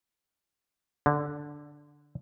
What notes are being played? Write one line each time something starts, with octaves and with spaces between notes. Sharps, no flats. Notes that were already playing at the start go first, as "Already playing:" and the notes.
D3